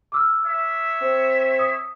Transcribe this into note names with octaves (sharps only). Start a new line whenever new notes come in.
D6 E6 F6
C#5 E5
C4
D#6